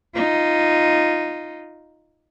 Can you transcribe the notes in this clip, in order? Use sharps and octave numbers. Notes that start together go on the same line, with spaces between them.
D#4 F4